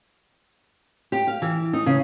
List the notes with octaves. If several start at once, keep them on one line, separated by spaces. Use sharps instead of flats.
G4
F5
E3
D#4
C#3